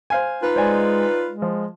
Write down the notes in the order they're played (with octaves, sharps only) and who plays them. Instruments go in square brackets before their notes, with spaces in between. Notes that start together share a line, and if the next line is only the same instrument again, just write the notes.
[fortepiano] C5 F5 G#5
[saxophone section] D#4 F4 B4
[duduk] G#3 [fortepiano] C5 D5 G#5
[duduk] G#3
[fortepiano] F3